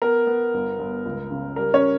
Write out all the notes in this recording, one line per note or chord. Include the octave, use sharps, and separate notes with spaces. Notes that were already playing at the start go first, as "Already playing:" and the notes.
B3 A#4
B3
G1
G1
C#2
C#3
G3 A#4
C#4 C#5